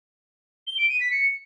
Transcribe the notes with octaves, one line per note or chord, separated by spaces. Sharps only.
G7
D7
D#7
B6
C#7